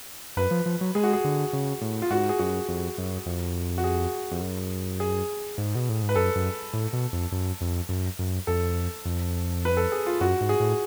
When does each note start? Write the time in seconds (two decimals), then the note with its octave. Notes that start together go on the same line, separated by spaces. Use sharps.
0.37 F#2 B4
0.51 F3
0.66 F3
0.81 F#3
0.95 G#3 G#4
1.03 F#4
1.13 G#4
1.24 D3
1.53 C#3
1.81 A2
2.02 F4
2.10 G#2 F#4
2.29 G#4
2.39 F#2 F#4
2.68 F2
2.98 F#2
3.26 F2
3.78 F#4
3.84 G#4
4.31 F2
4.42 F#2
5.00 G#4
5.58 G#2
5.75 B2
5.89 A2
6.02 G#2
6.09 B4
6.16 F#2 A4
6.35 F#2
6.73 A2
6.93 B2
7.13 F2
7.32 F#2
7.61 F2
7.89 F#2
8.19 F#2
8.47 F2 A4
9.05 F2
9.65 B4
9.77 A4
9.92 G#4
10.06 F4
10.20 F#2 F#4
10.41 G#2
10.49 G#4
10.60 A2